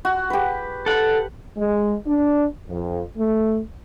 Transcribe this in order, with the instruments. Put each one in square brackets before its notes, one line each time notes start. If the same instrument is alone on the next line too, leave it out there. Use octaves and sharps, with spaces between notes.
[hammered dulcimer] F#4
G4 B4
[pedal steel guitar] A4 F#5
[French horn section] G#3
D4
F2
A3